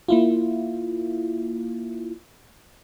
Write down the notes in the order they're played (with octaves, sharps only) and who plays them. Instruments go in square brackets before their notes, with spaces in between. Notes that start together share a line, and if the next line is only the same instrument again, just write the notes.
[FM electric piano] A#3 E4 F4